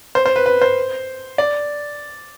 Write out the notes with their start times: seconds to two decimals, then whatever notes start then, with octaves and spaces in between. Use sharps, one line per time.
0.15 C5
0.26 C5
0.36 B4
0.46 B4
0.62 C5
1.38 D5